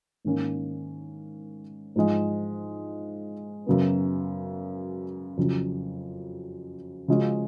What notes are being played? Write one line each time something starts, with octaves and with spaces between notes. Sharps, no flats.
G#2 D#3 A#3 C#4
G#2 F3 G#3
F#2 C#3 F#3 B3
F2 C#3 F#3
C#3 F3 G#3 C#4 F#4